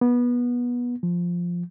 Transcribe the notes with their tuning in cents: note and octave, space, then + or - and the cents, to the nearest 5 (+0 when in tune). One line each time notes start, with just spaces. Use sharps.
B3 -20
F3 +0